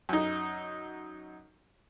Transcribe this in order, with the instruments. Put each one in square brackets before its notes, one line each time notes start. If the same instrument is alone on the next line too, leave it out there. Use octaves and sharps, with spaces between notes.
[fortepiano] F#2 D#4